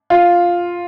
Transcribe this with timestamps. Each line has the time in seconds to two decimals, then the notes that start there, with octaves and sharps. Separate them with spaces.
0.10 F4